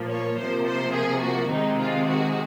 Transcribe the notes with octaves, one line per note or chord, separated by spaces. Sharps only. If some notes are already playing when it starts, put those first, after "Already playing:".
Already playing: A#2 F3 A#3
C#5
C3 F3 A#3 C5
C5
G#4
F#4
C3 D#3 G#3 C4 D#4
F4
F#4